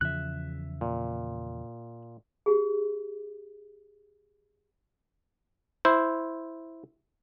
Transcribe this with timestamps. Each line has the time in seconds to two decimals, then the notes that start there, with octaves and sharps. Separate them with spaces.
0.01 E2 C#3 F3 E5 F#6
0.81 A#2
2.46 G4 G#4
5.85 E4 C5